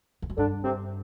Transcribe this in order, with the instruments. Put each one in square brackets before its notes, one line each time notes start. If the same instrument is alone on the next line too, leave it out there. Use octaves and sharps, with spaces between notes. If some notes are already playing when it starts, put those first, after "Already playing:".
[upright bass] E2
F#2
[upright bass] G2 [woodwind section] D3 D4
[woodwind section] C3 C4